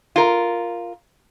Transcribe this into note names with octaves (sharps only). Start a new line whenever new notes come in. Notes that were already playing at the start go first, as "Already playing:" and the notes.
F4 A#4